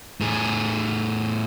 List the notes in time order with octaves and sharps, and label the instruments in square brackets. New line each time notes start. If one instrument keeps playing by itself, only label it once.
[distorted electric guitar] A2 G#4